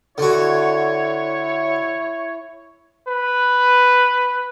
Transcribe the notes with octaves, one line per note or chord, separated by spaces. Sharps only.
D3 E4 F#4 C#5
B4